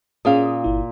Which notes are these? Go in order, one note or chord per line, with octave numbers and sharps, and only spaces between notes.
A#2 C#4 G#4 F5 D#6
G1 E4